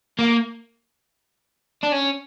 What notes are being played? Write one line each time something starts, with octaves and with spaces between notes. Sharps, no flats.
A#3
D4
C#4